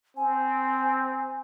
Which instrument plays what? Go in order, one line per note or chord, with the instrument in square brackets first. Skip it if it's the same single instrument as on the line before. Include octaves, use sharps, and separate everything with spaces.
[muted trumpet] C4 [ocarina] G#5